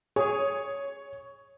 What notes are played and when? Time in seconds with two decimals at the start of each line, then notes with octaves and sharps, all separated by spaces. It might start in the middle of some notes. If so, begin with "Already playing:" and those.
0.16 G#4 C#5